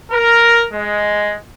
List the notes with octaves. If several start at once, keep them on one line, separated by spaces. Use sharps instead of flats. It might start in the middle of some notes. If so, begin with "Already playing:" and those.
A#4
G#3